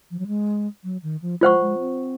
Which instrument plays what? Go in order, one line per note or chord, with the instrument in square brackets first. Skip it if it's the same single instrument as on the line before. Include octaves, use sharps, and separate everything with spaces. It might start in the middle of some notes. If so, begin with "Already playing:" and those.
[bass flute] F3
F#3
G#3
F#3
D#3
F3
[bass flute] G#3 [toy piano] F4 C5 F#5 C#6
[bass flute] G#3
C4